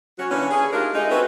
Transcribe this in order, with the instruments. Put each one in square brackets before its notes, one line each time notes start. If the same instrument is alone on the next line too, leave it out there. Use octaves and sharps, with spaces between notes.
[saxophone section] F#3 C#4 F#4
D3 E3 A#3 C#4
G#4
A3 D4 D#4 F4 G4 A#4
G#3 A3 D#4
C4 C#4 F#4 A4 B4 E5